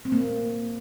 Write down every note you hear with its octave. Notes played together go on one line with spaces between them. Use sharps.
C4
A#3